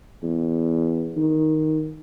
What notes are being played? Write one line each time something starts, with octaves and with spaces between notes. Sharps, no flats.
E2
D#3